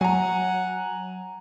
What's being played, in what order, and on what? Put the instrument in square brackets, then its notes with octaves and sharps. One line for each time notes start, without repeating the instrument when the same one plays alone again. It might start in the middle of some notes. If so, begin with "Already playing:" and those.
[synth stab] F#3 [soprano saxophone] F#5 [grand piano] G#5 A#5